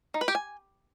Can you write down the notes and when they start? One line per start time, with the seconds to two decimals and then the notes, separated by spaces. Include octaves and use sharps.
0.14 D#4
0.21 B4
0.28 G4
0.35 G#5